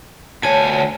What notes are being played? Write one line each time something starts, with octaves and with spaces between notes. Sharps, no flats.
D2 C#5 G#5 A5